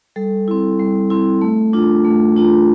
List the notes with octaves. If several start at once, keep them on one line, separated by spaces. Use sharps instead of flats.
G3 A4
C4 E4
G3
C4 E4
A3
D4 F4
A3
D4 F4